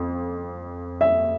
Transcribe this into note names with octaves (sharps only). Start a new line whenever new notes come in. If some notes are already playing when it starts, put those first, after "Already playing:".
Already playing: F2
E5